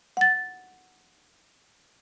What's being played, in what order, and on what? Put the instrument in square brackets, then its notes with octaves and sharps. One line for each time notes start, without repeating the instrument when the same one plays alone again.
[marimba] F#5 A6